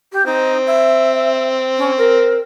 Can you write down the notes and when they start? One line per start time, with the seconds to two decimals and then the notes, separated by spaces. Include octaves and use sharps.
0.12 G4
0.26 C4 D#4
0.66 E5
1.78 C#4
1.98 A#4